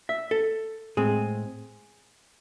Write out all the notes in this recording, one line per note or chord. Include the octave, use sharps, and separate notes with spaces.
E5
A4
A2 G#3 C4 G#4